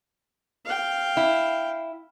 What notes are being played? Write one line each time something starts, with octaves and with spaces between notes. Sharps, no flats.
F5 G5
E4